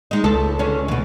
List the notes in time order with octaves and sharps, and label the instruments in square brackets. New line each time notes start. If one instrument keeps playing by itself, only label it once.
[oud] G#3 D#4
[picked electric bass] C#2 [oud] A4
[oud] D3 C#4
B2 E3